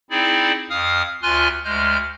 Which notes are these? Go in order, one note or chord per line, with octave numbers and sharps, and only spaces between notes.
C4 D#4 E4 G#4 D5
F2 F5 D#6 F6
D2 F4 G#5 C6 F6 F#6
D2 G#3 F6 G6